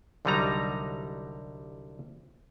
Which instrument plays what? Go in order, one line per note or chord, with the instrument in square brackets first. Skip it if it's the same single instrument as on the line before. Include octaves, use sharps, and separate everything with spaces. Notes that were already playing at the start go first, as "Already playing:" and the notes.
[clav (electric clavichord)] C2 D3 F#3 G3 D#4 A#5